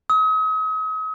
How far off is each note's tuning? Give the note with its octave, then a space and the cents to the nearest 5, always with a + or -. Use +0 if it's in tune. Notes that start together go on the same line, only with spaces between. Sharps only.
D#6 +40